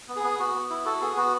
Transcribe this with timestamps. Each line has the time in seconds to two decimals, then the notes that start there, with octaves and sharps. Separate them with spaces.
0.08 B3
0.16 G#4
0.24 B3
0.39 B3 F#4
0.54 B3
0.70 E4
0.85 F#4 A4
1.01 B3 G#4
1.17 B3 F#4